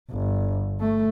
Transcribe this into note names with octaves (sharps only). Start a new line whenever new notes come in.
G1
A3